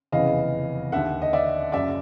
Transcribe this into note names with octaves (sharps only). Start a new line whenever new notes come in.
F1 E2 C#3 E3 D#5 F5
D#2 D3 E5 F#5
D#5
D5 E5
F#1 F#2 C#3 D5 E5